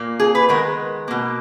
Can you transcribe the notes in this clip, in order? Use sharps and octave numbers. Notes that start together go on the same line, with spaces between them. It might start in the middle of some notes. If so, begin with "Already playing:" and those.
Already playing: A#2 A#3
G#4
B4
D#3 G#3 B3 A#4
B2 A#3